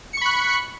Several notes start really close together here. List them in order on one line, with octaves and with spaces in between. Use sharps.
C#7 C#6 B5 F#6